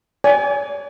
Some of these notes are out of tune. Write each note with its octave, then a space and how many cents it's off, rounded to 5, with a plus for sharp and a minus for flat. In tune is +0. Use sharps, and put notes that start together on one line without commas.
D5 -45 G#5 +0